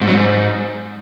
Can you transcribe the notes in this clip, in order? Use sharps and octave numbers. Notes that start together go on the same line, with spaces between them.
G#2
F#3
G#2